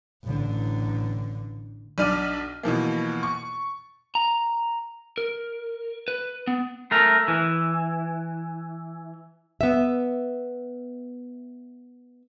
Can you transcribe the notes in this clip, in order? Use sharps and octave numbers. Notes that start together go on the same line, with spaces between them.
A1 D3
B1 D4 D5 F6 D#7
B2 E3 F3 A#3
C#6
A#5
A#4
B4
B3
A3 A#4
E3
B3 E5